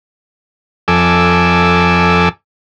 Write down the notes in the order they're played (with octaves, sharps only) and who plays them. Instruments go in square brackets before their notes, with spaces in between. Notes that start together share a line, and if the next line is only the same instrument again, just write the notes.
[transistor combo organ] F2 A4 G#5 D6 E6